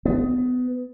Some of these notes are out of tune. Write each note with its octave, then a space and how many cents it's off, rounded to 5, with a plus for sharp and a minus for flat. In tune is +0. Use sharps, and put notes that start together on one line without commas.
B3 +25